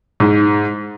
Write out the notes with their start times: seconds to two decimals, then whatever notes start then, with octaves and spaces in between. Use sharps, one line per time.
0.20 G#2